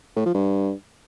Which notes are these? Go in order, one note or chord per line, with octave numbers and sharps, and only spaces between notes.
A2
F3
G2